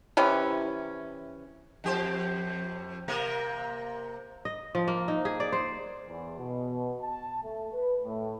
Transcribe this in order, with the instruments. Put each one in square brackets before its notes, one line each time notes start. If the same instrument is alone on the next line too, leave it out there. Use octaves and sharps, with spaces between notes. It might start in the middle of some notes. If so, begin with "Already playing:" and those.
[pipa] C3 E3 C#4
[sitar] F2 G4 C5
C3 A#3 A#4
[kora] D#5
F3
A#3
D#4
G#4
D5
C5
[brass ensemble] E2
B2
A5
A3
B4
A2